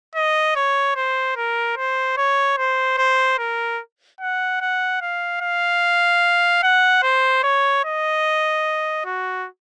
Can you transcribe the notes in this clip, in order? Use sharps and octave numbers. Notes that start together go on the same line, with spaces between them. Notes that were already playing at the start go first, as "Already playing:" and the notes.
D#5
C#5
C5
A#4
C5
C#5
C5
C5
A#4
F#5
F#5
F5
F5
F#5
C5
C#5
D#5
F#4